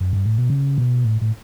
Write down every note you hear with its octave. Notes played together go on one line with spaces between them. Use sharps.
F#2
G2
A2
B2
C#3
B2
A2
A2